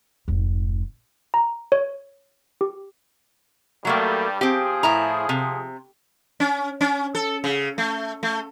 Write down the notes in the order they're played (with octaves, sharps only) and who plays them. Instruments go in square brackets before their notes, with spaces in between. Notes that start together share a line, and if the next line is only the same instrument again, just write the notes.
[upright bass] F1 G#2
[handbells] A#5
C#5
G4
[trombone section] G2 G3 [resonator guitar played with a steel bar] F#3 A3 A#3
[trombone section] F3 G#4 [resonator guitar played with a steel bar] C4 G4
[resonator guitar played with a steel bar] A2 E4 A#5
C3
[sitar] C#4
C#4
A4
C#3
A3
A3